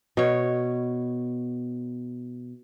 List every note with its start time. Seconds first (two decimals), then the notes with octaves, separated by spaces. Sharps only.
0.17 B2 C#5